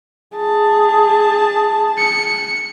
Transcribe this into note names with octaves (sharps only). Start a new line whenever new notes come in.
G#4 A5
C#7